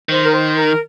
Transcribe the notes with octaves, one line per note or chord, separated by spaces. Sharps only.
D#3 C5
A#4
C5
A#4